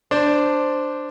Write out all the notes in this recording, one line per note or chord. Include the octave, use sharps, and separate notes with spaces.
D4 C5